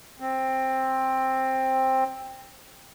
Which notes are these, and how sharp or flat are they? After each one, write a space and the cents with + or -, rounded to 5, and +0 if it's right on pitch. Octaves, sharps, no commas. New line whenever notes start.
C4 +10